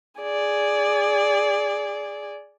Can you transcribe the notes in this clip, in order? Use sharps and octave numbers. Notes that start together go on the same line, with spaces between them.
G#4 D5